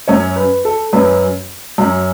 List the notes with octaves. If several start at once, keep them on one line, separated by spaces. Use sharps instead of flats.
F#2 F#3 C#4 C#5
B4
A4
F#2 F#3 C#4 B4
F#2 F#3 C#4